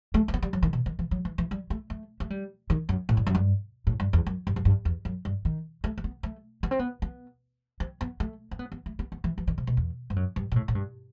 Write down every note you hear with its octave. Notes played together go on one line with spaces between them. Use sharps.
A3
A3
B3
G3
F#3
D#3
B2
D#3
E3
F#3
E3
E3
G3
A3
A3
A3
G3
D#3
F#2
A2
G2
F#2
G2
A2
G2
E2
F#2
G2
F#2
G2
E2
F#2
G2
D#3
A3
A3
B3
A3
B3
C4
B3
B3
C4
B3
A3
C4
B3
B3
A3
B3
B3
E3
E3
D#3
C3
B2
E2
G2
F#2
G2
B2
A2
A2
G2